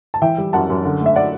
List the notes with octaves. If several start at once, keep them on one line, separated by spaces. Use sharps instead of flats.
A5
E3 E5 G5
G3
F#2 F#5 A5
F#2
D3
A3 E5
D5 F#5